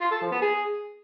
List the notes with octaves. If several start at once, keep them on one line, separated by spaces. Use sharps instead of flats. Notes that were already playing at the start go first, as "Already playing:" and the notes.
F4
A4
F3
B3
G#4